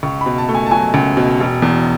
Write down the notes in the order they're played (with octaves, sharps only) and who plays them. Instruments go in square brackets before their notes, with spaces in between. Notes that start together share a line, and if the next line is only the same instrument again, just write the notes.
[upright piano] C#2 C#6
B2 B5
A5
A3
G#5
A5
F#3 G#5
C#2
B2
E1
E2